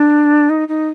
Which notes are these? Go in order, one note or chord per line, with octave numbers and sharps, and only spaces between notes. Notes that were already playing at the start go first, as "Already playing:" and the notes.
Already playing: D4
D#4
D#4